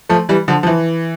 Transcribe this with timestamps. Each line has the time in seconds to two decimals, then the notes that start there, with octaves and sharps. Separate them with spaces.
0.09 F3 A3
0.29 E3 G3
0.48 D3 F3
0.63 F3
0.67 E3